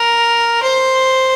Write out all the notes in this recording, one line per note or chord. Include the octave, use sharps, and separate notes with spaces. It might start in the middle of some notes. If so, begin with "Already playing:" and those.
Already playing: A#4
C5